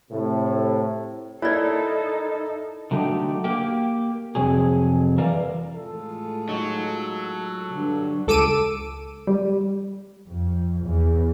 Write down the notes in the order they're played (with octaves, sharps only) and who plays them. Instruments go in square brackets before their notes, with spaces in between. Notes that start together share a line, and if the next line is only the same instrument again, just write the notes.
[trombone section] A2 C3
[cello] D#4 A4 [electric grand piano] E4 A#4 [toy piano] C#5 D5
[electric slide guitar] D3 F#3 A3 D#4 G4
A#3 G4
F2 C3 F#3 G#4
E3 A#4 D5 F5
[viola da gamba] A2 G#3 F4 [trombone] A4
[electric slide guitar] F#3 [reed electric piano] D#4
[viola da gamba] G2 D3
[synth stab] C#2 A4 D6 E6 D7 D#7
G3
[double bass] F2
E2